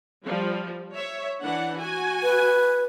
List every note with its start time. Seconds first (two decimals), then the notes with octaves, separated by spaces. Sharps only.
0.26 F3 G3
0.95 C#5 E5
1.42 E3 D4 F#5
1.80 F#4 G#5
2.23 B4